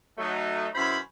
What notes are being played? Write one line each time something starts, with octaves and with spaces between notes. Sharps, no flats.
F#3 A3 D#4
F#2 B2 E4 C5 B5